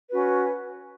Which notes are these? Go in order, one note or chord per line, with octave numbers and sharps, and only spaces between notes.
C#4 F#4 B4